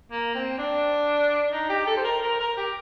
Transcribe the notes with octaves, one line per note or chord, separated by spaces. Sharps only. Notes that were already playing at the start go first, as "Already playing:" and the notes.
A#3
C4
D4
D#4
G4
A4
C5
A#4
A#4
A#4
G4